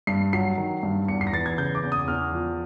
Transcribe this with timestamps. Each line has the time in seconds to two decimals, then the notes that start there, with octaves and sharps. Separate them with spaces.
0.07 G2 C7
0.33 F#3 C7
0.57 D#3
0.83 G2
1.08 E2 C#7
1.21 C7
1.27 A#6
1.33 E3 A6
1.46 G#6
1.58 C#3 G6
1.75 D6
1.83 E2
1.92 D#6
2.08 E2 F6
2.33 F3